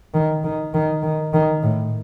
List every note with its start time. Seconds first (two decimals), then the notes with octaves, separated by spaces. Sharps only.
0.14 D#3
0.44 D#3
0.74 D#3
1.03 D#3
1.33 D#3
1.63 A2